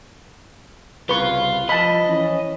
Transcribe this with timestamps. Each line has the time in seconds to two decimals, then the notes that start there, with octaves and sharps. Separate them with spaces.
1.09 C2 C#3 F4 B4 C#6
1.69 F3 D#5 A5 B5
2.06 E3 C#4